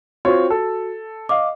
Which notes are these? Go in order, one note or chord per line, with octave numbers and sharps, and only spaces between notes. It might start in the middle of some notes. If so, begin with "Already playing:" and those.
C4 F4 F#4 C#5
A4
D#5 F5 D6